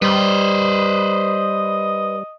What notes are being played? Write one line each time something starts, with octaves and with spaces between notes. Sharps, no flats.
G3 B4 C5 D#5